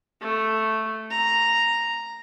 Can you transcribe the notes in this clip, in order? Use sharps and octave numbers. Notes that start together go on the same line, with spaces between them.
A3
A#5